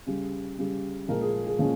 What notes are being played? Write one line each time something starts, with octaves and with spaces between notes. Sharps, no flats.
C#3 G3
C#3 G3
A#2 F3 G#3 A#4
G#4
G#4
A#2 F3 G#3 C#4